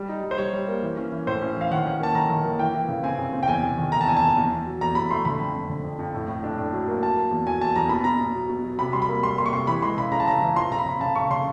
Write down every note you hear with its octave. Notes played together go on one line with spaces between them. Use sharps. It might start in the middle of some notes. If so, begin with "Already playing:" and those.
Already playing: G3
D#4
G3
C5
G3 C#5
G3
A#3
E3
C#4
E3
A2 C5
C#4
E3 F5
D#3 F#5
C#4
A#3 A5
D#3 A#5
D#3
A#3
E3 G5
E3
C#3
C4 G#5
C#3
C4
G5
E2 G#5
C3
D#3
E2 A#5
A5
E2 G#5
A5
D#3
E2
E2
F#3
E2 A#5
E2 B5
A3 C6
D3 B5
F2
F2
D3
F2
F2
A2
A2
D4
A2
F#3
A#3
F#3 A5
A#3
E2
F#3 G#5
E2 A5
E2 A#5
B2 B5
B2 A#5
B2
F#3
B2
F#3
C3 B5
G3 C6
B5
A#3
G3 C6
A#3 C6
C#6
C3 C6
E3 B5
G#3 C6
C#3 B5
C#3 A#5
A5
C#3 A#5
E3
F3 C6
C#3 A#5
B5
C#3
C#3 A5
C#3 C#6
C#3 C6